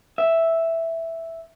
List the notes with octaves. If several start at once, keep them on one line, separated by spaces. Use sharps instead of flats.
E5